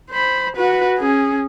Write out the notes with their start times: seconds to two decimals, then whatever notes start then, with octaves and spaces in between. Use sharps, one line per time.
0.11 C5 B5
0.56 F#4 B4
0.98 C#4 G#4